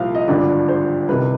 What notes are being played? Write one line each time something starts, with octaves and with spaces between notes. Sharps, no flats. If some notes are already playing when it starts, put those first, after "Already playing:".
Already playing: C2 A#2 F3 F5
D#5
G#1 G2 D3 F3 D5
C5
C2 C3 D#3 B4